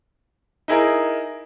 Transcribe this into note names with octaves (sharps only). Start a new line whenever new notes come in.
D#4 E4 G#4 A#4